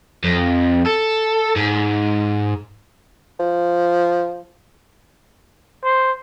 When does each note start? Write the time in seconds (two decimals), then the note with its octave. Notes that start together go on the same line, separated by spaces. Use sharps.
0.24 F2
0.86 A4
1.56 G#2
3.39 F3
5.84 C5